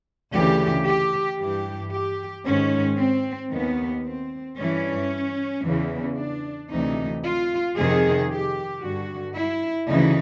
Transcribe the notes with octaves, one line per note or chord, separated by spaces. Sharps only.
D2 C#3 E3 G4
G4
G2 E3 G4
G4
G#2 D#3 C#4
C4
D#2 D#3 B3
C4
G2 E3 C#4
E2 C#3 E3
D4
D2 C3 E3 D#4
F4
F2 C3 D#3 G#4
G4
G2 D3 F#4
E4
D2 C#3 E3 D#4